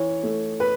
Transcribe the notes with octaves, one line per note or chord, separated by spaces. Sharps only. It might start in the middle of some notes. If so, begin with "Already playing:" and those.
Already playing: E3 C#5
A3
B4